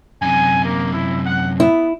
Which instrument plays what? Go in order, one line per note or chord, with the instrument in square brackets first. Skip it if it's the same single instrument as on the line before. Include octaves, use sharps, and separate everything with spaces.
[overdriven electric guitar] F#2 C3 [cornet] G#5
[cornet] A#3
E4
F#5
[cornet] B3 [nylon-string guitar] E4